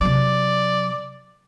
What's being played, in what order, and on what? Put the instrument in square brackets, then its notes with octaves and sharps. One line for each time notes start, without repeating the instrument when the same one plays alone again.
[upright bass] C3 F#3 [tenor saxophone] D5